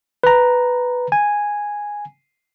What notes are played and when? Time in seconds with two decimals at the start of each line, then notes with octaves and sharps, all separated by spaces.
0.24 B4 A#5
1.12 G#5